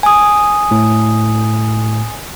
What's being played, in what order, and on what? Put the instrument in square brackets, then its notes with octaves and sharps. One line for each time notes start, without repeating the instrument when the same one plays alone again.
[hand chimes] G#5 D#6
[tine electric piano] A2